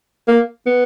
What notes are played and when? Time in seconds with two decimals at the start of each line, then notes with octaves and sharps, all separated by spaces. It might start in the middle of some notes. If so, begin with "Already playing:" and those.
0.28 A#3
0.66 B3